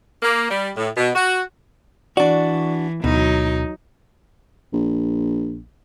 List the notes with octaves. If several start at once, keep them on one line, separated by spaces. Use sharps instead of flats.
A#3
G3
A2
B2
F#4
E3 D4 F#4 D5 C#6
D2 B2 F#3 D#4
A#1